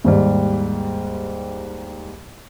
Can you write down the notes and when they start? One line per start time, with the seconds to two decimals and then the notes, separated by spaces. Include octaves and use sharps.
0.04 D#2 G#2 G3